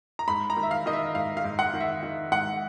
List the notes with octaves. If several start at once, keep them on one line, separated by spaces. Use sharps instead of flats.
A#5
G#2 B5
A#5
D#3
E5
F5
D#3 D#5
E5
G#2 F5
F5
G#2
F#5
D#3
E5
D#3
G#2 F#5